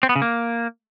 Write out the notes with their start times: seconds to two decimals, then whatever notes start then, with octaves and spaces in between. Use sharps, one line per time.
0.03 C4
0.09 B3
0.16 C#3
0.22 A#3